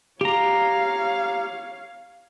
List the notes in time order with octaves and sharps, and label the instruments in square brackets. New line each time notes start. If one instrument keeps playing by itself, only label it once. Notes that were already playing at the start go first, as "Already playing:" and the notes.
[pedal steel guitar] G4 A#5 [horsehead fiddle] C#5 F5